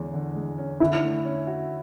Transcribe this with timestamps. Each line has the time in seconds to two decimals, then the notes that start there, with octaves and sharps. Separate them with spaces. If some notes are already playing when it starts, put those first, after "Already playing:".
Already playing: E2 D3 G#3 C#4
0.13 D3
0.35 G#3
0.58 C#4
0.80 D3 E4
1.03 A3
1.25 C#4
1.47 F#4